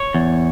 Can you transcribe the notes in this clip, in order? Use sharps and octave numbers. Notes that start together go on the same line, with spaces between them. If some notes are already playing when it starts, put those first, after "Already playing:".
Already playing: C#5
E2